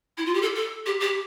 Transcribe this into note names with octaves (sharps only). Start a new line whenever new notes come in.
E4
F4
G4
A4
A4
G4
G4